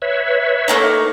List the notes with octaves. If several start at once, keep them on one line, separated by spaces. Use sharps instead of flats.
B4 C#5 E5
A3 A#3 D#4